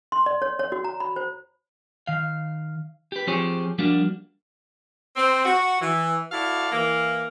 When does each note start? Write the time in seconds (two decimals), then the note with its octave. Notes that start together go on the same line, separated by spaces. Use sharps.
0.12 C6
0.26 D5
0.42 C#5
0.59 C#5
0.72 F#4
0.84 A#5
1.00 B5
1.16 C5
2.07 D#3 F5
3.12 G4 B4
3.27 F3 C4 G4 G#4 C5 C#5
3.78 F3 G3 A#3 D4 F#4
5.16 C4
5.45 F#4
5.81 E3
6.32 E4 F#4 A4 D5 F5
6.71 E3 A#3